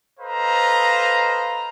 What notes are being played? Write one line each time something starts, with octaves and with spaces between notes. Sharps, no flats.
A4 B4 C5 D#5 F5 A#5